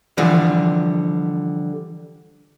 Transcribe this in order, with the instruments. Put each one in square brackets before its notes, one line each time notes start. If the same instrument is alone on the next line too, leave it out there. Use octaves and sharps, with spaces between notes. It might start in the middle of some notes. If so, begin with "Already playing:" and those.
[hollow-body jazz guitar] D3 E3 F3 G3